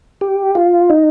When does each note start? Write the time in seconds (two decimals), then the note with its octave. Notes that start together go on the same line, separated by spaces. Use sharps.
0.21 G4
0.55 F4
0.90 D#4